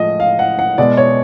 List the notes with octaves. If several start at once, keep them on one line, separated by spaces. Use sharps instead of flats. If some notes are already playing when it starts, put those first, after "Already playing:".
Already playing: A2 F3 G#3 D#5
F5
F#5
F#5
B2 G#3 D5
C#5